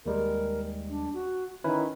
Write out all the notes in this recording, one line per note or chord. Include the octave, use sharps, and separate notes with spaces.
D#2 G3 G#3 A#4
D4
F#4
D#3 C#4 E4 B4